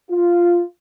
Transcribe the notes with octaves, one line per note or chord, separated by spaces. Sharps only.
F4